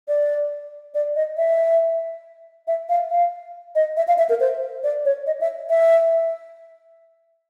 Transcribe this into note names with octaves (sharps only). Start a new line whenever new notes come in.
D5
D5
D#5
E5
E5
F5
F5
D#5
E5
F5
E5
A#4
C5
D5
C#5
D#5
E5
E5